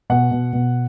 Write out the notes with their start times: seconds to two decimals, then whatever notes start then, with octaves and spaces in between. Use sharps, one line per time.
0.10 B2 F#5
0.31 B2
0.53 B2